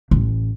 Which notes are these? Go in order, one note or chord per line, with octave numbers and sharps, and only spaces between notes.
A1